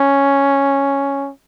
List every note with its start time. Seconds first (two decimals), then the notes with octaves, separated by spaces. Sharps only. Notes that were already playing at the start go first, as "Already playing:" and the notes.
Already playing: C#4